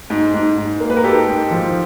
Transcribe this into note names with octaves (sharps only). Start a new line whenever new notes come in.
G#2
G#2
G#2
A#3
B4
A#4
G#2 G4 A4
G#2
F3